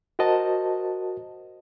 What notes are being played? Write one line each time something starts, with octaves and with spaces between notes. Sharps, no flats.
F#4 A#4 C5 D#5 A5